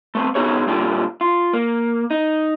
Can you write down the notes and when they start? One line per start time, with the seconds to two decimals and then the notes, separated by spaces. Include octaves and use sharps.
0.15 A3 B3 C4
0.35 C#3 B3 D#4 F#4 G#4 C#5
0.67 G2 A#2 D3 F4 G4
1.21 F4
1.53 A#3
2.11 D#4